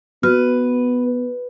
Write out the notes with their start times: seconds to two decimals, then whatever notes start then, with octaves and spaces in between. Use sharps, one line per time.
0.23 B3 F#4 B4 F6